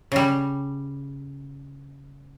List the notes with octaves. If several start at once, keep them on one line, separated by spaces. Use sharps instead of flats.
C#3 G3